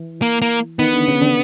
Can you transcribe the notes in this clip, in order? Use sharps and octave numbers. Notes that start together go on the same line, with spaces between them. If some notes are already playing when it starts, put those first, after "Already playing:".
Already playing: E3
A#3
A#3
D#3 B3
D3
C#3
D3